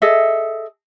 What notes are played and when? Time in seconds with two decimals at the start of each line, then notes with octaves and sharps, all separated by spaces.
0.02 G#4 A4 D#5 E5